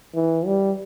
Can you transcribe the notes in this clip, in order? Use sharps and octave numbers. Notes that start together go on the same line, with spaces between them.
E3
G3